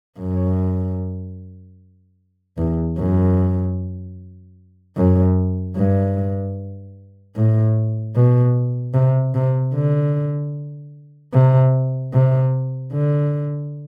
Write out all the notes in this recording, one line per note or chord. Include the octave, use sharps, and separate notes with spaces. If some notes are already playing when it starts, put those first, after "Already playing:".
F#2
E2
F#2
F#2
G2
A2
B2
C3
C3
D3
C3
C3
D3